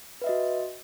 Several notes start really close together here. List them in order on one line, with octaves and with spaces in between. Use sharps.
B4 E5 D#5 F#4